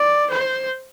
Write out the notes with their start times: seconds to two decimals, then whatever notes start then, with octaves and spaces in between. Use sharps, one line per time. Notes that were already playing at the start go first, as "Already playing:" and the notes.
Already playing: D5
0.30 C5